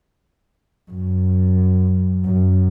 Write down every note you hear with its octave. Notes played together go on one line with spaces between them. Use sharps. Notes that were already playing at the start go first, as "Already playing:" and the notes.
F#2
F#2